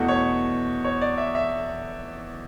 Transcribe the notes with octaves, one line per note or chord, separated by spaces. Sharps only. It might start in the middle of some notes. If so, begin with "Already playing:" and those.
Already playing: E2 B2 A3 F#5
C#5
C#5
D5
E5
E5